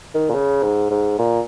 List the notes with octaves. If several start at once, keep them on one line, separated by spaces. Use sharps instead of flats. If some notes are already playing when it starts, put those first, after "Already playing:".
D#3
A#2
C#3
G#2
G#2
A#2